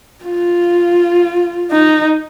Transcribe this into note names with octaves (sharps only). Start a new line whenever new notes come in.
F4
D#4